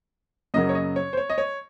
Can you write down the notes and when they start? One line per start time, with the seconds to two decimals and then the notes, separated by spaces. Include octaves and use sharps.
0.54 F#2 C#3 F#3 A#3 D#5
0.69 C#5
0.75 D#5
0.96 C#5
1.13 C5
1.17 C#5
1.30 D#5
1.38 C#5